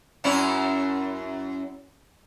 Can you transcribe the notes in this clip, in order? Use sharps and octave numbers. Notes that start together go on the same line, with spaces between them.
F#2 C#4 E4